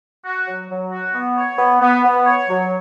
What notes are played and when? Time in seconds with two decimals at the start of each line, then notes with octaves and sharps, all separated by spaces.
0.24 F#4
0.47 F#3
0.69 F#3
0.92 F#4
1.13 B3
1.36 C#5
1.58 B3
1.81 B3
2.04 B3
2.26 C#5
2.48 F#3